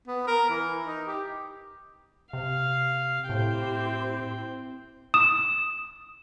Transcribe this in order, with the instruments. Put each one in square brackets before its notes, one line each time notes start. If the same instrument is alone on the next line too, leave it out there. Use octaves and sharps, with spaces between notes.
[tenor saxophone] B3
A#4
E3
D#4
G4
[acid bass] C3 [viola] F5
[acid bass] A2 [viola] C4 G5 [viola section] E4 G4 C5
[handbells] D#6 [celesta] E7